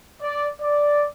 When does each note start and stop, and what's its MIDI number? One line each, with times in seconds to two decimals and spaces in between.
0.21 0.48 74
0.61 1.06 74